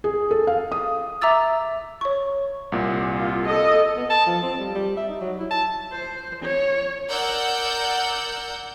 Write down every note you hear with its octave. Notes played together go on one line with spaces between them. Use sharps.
G#4
A4
F5
D#6
E5 A#5 D6 E6 A6
C#5 C#6
C2 A#2
F4
A4 D#5
B3
A5
F3
C4
G3
G3
E5
D#4
F#3
E4
A5
C5
C#5
A#4 D5 F#5 E6 G6